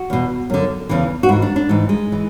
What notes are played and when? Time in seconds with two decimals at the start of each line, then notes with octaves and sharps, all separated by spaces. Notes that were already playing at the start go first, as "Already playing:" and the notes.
Already playing: F#4
0.10 E2 B2
0.50 F#2 D3
0.89 E2 C#3 E3
1.23 F#4
1.29 G#2 E3 E4
1.42 D4
1.56 D4
1.69 G#2 E3
1.89 G#3
2.12 E3